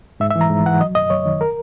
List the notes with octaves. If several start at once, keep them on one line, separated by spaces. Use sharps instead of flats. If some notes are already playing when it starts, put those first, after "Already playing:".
G#2 E5
E5
E3
A#5
G#2
E3 F#5
F#3 D#5
F#2 D#5
F#2 C#5
D#3
A#4